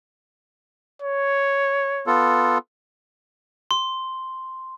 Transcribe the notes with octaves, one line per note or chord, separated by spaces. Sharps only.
C#5
B3 F4 A4
C6